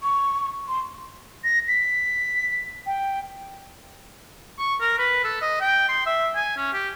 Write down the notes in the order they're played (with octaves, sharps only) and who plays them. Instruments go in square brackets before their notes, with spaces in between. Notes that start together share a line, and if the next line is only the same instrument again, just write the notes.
[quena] C#6
C6
[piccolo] A#6
B6
G5
[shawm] C#6
A#4
B4
A4
D#5
G5
C6
E5
G#5
C#4
G4